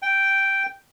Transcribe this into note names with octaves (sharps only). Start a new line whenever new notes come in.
G5